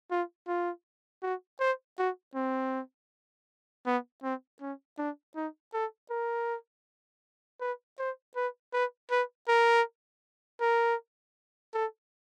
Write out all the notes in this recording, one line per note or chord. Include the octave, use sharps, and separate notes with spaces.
F4
F4
F#4
C5
F#4
C4
B3
C4
C#4
D4
D#4
A4
A#4
B4
C5
B4
B4
B4
A#4
A#4
A4